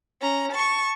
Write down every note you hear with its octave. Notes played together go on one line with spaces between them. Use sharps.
C#4 A#5
A5 C#6